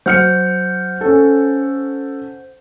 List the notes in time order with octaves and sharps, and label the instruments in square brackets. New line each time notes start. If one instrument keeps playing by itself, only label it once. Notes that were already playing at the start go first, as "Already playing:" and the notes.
[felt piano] F#3 F6 C#7 [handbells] C5 F#5
[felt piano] C#4 A4